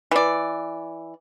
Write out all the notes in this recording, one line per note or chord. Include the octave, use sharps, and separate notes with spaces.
E3 D5